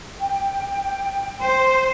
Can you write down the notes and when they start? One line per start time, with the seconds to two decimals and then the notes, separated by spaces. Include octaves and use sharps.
0.18 G5
1.41 C5